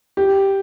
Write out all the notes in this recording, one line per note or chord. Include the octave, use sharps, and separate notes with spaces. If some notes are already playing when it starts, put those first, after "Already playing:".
G4